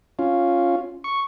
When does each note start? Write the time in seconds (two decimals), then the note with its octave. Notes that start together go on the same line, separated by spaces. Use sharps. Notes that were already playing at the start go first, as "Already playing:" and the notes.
0.19 C#4 F4
1.04 C#6